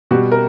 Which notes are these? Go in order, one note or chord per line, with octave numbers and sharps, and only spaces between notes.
B2 G3 F#4
A#4